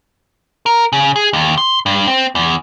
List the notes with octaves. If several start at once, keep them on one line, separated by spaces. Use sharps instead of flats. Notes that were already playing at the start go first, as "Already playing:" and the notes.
A#4
C#3
G#4
D#2
C6
G2
C4
E2